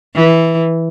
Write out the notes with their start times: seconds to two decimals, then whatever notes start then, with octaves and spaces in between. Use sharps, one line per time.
0.15 E3